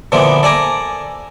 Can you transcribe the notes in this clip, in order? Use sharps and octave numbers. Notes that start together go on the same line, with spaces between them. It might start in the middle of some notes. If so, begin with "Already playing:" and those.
A#2 D3 E3 F3 B3
A4 D5 G#5 A#5